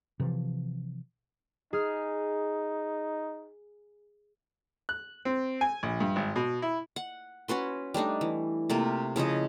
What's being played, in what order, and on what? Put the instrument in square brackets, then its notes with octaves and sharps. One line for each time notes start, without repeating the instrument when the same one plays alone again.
[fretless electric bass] C3 E3 F3
[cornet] D#4 [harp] G#4 F6
[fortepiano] F#6
C4
G#5
A#1
G2
G#1
B2
E4
[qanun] F#5
C#4 F#4 B4 C6
G3 A3 D4 D#4
E3
C3 A3 A#3 F4
C#3 F3 E4 D#5